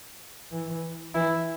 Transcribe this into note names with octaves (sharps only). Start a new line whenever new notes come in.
E3
E3 E4